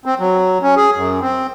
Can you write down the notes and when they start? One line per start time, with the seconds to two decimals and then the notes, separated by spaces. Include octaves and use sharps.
0.05 C4
0.20 F#3
0.62 C#4
0.76 G#4
0.96 F#2
1.22 C4